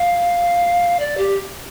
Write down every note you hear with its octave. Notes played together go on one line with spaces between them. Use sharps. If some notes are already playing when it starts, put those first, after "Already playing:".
Already playing: F5
D5
G4